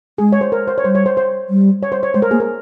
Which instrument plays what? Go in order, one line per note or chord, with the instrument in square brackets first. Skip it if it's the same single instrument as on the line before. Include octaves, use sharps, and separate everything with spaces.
[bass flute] G#3 [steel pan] G#4
[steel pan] C#5
C5
A#4
C5
C#5
[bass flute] G3 [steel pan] C5
[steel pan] C#5
C5
C5
[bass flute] G3
[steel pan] C#5
C5
C#5
[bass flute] G#3 [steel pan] C5
[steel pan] A#4
[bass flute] A#3 [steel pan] G#4
[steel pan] A#4